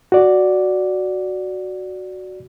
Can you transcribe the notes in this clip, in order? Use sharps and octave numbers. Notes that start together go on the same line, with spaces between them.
F#4 D5